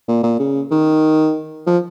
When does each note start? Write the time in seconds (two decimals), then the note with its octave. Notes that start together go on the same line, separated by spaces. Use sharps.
0.08 A#2
0.23 A#2
0.39 C#3
0.71 D#3
1.67 F3